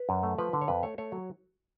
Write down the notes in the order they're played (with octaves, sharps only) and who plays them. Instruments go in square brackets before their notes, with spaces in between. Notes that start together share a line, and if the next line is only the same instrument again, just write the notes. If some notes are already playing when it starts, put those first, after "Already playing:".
Already playing: [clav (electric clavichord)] B4
F#2
A3
F3 B4
D3
C#5
F2 B4
A3 C#5
A3 C#5
F#3